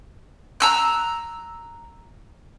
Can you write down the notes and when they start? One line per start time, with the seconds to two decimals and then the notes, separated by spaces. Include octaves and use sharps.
0.60 A#5 E6 F#6